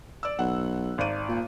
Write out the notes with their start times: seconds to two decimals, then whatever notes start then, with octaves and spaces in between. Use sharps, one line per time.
0.23 D5 E6
0.39 B1 F#5
0.98 G#1 D5 D#7
1.28 A#2